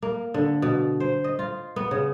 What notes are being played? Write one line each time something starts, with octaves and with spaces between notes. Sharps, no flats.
A#3
D3
B2
C5
D#5
F4
B3
C#3